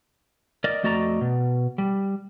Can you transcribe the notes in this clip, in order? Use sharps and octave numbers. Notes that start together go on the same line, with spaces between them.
A#4 D5 D#5
F2 A3 F#4 D5 D#5 A#5
B2
G3